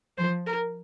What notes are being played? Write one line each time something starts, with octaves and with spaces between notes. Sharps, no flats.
F3 C5
A#4